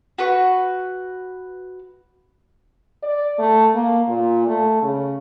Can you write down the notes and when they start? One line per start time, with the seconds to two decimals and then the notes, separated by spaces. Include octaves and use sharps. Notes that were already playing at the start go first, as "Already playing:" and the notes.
0.18 F#4 B4 C#6
3.03 D5
3.39 A3
3.75 A#3
4.08 A#2
4.47 A3
4.82 C#3